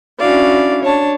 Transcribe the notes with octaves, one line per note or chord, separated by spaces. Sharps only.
C#4 D4 E4 F#4 D5 F5
D4 C#5 A5